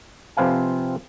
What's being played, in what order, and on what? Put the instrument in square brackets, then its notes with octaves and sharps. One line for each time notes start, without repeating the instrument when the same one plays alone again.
[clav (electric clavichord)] C3 F3 C4 B4 F5 G#5